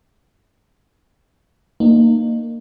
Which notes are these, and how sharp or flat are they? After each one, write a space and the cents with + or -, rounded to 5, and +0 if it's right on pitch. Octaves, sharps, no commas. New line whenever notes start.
A#3 -15 D#4 -30